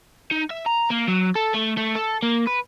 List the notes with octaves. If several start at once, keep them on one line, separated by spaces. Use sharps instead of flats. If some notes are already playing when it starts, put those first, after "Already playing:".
D#4
E5
A#5
A#3
F#3
A4
A3
A3
A4
A#3
B4